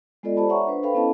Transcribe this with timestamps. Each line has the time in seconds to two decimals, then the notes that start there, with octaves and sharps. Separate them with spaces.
0.23 G#3 B3 F4 A4 D5 D#5
0.37 G4 C5 D5 A5 B5
0.49 C#5 E5 F#5 A#5 C#6
0.67 D4 B4 C5
0.83 A4 B4 C5 F5 G5 B5
0.94 B3 C#4 E4 A4 D#5 A5